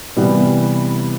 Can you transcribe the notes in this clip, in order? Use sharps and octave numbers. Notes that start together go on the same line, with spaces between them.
C3 E3 G3 B3